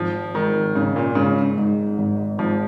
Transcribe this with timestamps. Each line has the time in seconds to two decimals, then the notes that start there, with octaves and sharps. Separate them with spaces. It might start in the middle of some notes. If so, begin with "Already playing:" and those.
Already playing: G#1 F3
0.34 G#2 D#3
0.75 G#1 C#3
0.96 A#2
1.15 G#2 C#3
1.57 G#2
1.98 G#1
2.38 G#1 F3